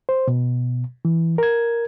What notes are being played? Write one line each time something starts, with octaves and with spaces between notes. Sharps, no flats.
C5
B2
E3
A#4 G#6